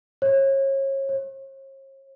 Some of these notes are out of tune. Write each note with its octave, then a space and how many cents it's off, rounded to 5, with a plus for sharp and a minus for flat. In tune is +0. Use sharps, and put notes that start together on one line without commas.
C#5 -30
C#5 -45